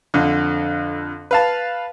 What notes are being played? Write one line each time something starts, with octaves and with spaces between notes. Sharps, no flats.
F2 D3
B4 F5 A5